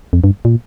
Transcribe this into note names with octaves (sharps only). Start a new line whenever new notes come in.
F2
G2
A#2